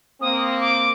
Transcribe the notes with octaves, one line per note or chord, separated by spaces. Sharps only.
A#3 C4 D#6
D6